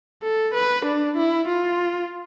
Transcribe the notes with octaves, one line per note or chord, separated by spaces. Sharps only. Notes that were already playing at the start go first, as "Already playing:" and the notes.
A4
B4
D4
E4
F4